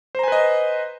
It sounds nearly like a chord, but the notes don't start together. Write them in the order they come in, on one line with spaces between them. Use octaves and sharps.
C5 A#5 G#5 B4 D#5